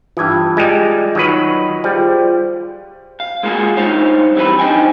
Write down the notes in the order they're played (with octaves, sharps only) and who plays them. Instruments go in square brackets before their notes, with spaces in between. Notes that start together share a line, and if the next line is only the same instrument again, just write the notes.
[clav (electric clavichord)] G2 E3 [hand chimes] F4 D#6 G#6
[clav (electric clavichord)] G3 G#3
D#3 F#3 B4
[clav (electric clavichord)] G3 [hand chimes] F4 G#4 C5
[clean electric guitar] F5
G#3 A#3 F4 F#4 G#4
G2 D#4 C5 C#5 F5
F2 E3 F#3 G3 B4 B5
D4 D#4 C5 D#5 G5 G#5